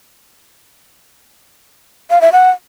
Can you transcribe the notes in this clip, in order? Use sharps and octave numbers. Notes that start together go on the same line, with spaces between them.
F5
E5
F#5